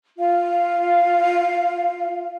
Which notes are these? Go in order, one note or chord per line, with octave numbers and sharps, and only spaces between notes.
F4 F5